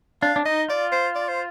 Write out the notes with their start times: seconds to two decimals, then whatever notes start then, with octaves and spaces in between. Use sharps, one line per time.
0.22 D4 F5
0.36 D4
0.45 D#4 D#5
0.68 F4 D5
0.92 C5
1.15 D5
1.28 C5